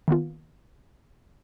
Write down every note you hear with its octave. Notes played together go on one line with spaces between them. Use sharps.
D#3 A#3 B3 F4